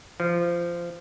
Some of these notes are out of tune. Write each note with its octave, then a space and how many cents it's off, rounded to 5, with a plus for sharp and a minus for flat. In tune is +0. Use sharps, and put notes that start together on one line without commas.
F3 -20